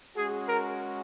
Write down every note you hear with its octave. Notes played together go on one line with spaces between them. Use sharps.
G#3 C#4 F#4 G#4
A#4